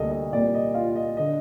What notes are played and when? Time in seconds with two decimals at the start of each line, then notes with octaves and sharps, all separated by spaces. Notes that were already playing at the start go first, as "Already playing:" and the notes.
Already playing: D2 C3 G3 A#3 A4 D#5
0.12 D#5
0.32 C2 A#2 G3 A#3 D5
0.54 D#5
0.74 F4 F5
0.96 D#5
1.17 D3 D#5